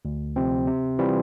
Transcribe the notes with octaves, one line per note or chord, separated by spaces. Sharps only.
D2
C3 F3 C4
C3
E3 G3 C4 F4